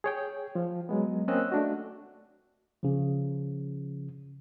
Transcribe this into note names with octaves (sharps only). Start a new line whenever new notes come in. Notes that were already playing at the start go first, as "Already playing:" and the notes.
G#4 C#5 G5
F3
F#3 G#3 B3
A#3 C4 C#4 D#5 E6 F#6
A3 D4 F#4
C#3 F3